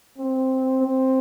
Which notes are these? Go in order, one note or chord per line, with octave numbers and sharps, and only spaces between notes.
C4
C4